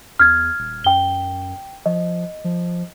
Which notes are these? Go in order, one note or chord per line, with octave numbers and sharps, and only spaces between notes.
E2 F6 G#6
D#1
F#2 G5 G7
F3 D#5
F3